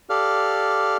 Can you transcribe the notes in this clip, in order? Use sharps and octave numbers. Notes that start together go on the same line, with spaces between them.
G4 A4 D5 F5 F6